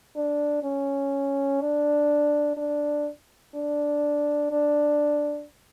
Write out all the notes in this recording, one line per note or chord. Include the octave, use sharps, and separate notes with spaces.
D4
C#4
D4
D4
D4
D4